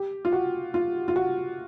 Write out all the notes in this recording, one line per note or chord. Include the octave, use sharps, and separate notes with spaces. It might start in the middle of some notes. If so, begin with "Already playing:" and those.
Already playing: G4
F4
F#4
F4
F4
F#4